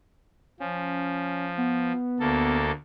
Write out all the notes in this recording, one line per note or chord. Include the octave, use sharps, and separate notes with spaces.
F3 C#4
B3
D2 A#3 A4